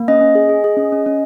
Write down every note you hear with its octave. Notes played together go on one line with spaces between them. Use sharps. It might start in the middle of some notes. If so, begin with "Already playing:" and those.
Already playing: A#3
C#4 D#5
C#4
G#4
G#4
G#4
C#4
C#4
C#4